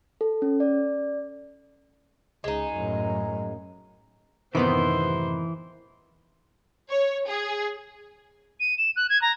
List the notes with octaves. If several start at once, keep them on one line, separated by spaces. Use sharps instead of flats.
A4
C#4
D5
C#2 G#3 D#4
F#2 A2
F#2 A2 C3 D#3 E3 B3 D#4 C5
C#5
G#4
D#7
E7
F#6
G#6
A#5